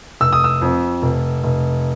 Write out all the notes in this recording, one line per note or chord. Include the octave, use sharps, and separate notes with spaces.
F1 E6
D#6
E6
F2
F1
F1